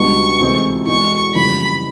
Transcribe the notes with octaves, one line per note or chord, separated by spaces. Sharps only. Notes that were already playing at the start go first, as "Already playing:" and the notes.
Already playing: C#2 B2 G3 B3 D4 C#6
D2 C3 E3 G#3 C4
E2 B2 G#3 C#6
F#1 F2 C#3 E3 G3 B5